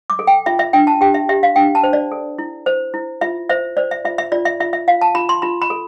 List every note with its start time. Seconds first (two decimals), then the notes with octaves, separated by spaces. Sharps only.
0.10 D6
0.19 A4
0.27 G5
0.46 F4 E5
0.59 E5
0.73 D4 G5
0.87 A5
1.01 G4 G5
1.14 E5
1.29 G4 E5
1.43 F5
1.56 D4 G5
1.75 A5
1.83 C5
1.93 D5
2.12 A4
2.38 E4
2.66 C5
2.94 E4
3.21 F4 E5
3.50 C5 E5
3.77 C5 D5
3.91 E5
4.05 F4 E5
4.18 E5
4.32 F4 D5
4.45 E5
4.60 F4 E5
4.73 E5
4.88 F4 F5
5.01 A5
5.15 F4 B5
5.29 C6
5.42 F4 B5
5.62 B5
5.70 A4